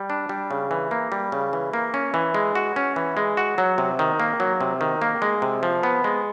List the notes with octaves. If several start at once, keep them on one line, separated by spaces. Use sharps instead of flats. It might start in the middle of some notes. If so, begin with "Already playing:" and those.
Already playing: G3
D4
G3
C#3
E3
A#3
G3
C#3
E3
A#3
C#4
E3
G#3
F#4
C#4
E3
G#3
F#4
F#3
C3
D#3
A#3
F#3
C3
D#3
A#3
G#3
C3
F3
B3
G#3